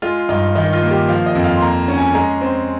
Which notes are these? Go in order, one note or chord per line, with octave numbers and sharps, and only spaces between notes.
G#3 F4
G2 D#4
D#3 D#4
F4
A#3
G4
F3 F5
D#5
F2
F5
C6
A#3 A#5
C#4
G#5
G#3 A#5
C4